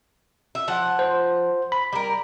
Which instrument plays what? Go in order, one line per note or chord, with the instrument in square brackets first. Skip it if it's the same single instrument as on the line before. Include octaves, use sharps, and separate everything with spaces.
[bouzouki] E5
F3 F#5
[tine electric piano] C5
B5
[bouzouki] G3 A#4